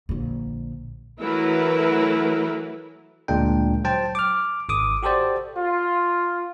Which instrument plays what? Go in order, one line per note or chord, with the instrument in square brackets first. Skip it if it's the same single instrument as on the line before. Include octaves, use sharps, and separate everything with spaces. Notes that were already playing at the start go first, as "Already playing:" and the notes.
[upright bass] A#1 D3
[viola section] E3 F#3 A3 E4 A#4 B4
[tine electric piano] D2 A#2 G#3 A#3 D4 G5
F#3 C5 G5 A5
D6 F6
G#1 D6 D#6
F#4 G4 A4 C5 D5
[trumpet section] F4